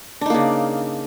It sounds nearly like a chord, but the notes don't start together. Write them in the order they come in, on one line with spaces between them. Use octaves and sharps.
D4 D#4 A#3 C#3